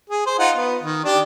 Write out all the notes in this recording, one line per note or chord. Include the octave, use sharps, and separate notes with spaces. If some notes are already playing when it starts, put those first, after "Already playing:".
G#4
C5
D#4 F4 F#5
B3
D#3
D4 G4